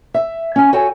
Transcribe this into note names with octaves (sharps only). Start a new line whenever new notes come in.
E5
C#4 G#5
F#4 A4 C#5 G5 G#5